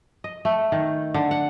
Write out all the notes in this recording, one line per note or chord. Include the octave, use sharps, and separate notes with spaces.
D#5
A3
D#3
D3
F#5